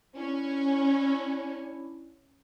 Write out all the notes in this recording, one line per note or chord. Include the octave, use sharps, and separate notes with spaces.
C#4 D4 E4